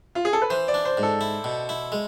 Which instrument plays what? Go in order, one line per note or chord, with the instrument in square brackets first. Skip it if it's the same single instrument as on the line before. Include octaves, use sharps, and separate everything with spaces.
[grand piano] F4
G#4
A4
B4
[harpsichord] E3 [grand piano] C5
[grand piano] D5
[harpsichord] D4
[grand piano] C5
[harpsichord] G#2
[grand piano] A4
[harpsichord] E4
B2
E4
G#3